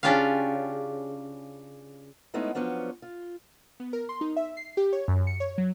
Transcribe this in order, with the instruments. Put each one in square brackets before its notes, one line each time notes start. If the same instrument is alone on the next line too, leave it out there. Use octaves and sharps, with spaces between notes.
[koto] C#3 C#4 D4 F4 G4 F5
[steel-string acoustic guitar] G#3 A3 B3 C#4 D#4 E4
F3 F#3 B3 C#4 D4
F4
[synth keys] B3
A#4
C6
D#4
E5
C7
G4
C#5
F#2
C#7
C#5
F#3